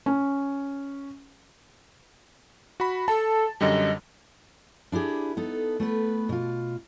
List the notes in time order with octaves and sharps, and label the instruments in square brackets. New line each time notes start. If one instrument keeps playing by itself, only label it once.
[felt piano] C#4
[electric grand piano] F#4 B5
[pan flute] A4 [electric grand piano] A5
[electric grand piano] F#2 D3 G3 [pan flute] D#5
[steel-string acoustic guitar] D4 E4 G4 G#4
B3 D#4 A4
A3 B3 B4
B2 F4